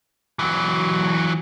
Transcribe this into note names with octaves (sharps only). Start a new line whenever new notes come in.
E3 F#3